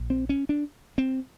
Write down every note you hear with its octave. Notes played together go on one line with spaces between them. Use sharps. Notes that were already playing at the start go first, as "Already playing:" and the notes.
Already playing: A#1 A#2
C4
C#4
D4
C4